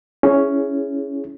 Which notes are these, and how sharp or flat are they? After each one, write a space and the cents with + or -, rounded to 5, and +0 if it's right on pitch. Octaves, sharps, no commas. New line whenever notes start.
C#4 +5 E4 +0 G#4 +0